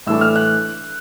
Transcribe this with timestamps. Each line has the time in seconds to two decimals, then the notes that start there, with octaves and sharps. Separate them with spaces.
0.06 A2 E3 A3 D4 E6
0.21 F6
0.36 F#6